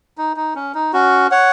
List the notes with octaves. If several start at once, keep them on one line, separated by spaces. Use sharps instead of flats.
D#4
D#4
C#4
D#4
C#4 F#4
C#5 F#5